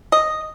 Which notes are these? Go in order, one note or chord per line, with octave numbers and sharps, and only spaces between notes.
D#5